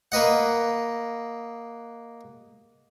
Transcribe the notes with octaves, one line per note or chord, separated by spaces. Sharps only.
A#3 B4 D#5 F#5